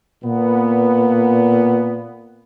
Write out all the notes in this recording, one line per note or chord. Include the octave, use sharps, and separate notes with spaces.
A#2 B3